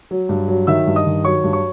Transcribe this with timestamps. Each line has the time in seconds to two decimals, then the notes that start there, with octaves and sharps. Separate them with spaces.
0.11 F#3
0.29 G2
0.48 F#3
0.67 D#3 E5 E6
0.87 G2
0.96 D#5 D#6
1.05 D#3
1.24 F#3 C#5 C#6
1.44 G2
1.53 C#5 C#6